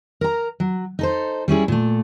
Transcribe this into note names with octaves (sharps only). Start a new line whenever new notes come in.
A#4 A#5
F#3
D#4 A4 C5
G3 C#4 E4 G#4
A#2 A3